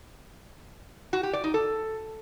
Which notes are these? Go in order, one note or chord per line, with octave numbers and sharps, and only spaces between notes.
F#4
G4
D5
D#4
A4